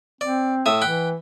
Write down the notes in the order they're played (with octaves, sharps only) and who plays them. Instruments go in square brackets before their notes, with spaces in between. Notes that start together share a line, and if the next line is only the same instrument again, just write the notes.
[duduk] C4 [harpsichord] D5
[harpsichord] A2 E5 D#6
[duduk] E3 [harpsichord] F#5 G5 B5